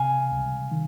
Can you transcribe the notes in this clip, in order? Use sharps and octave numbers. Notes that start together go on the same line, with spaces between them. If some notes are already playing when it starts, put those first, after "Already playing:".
Already playing: C3 F5 G#5
C#2
D#3